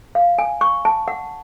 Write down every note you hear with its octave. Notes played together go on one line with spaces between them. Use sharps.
F5
G#5
C#6
A5
F#5